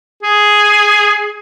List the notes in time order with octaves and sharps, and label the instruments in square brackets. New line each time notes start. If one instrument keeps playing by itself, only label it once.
[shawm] G#4